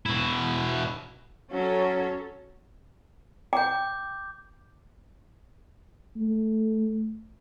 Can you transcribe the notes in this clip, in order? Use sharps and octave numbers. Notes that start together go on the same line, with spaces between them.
B2 E4
F#3 C#4 A4
G5 D6 G6
A3